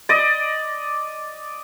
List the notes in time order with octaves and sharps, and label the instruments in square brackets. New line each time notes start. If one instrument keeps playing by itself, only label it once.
[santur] D5 D#5